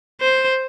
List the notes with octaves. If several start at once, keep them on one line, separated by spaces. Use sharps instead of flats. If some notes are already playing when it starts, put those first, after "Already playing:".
C5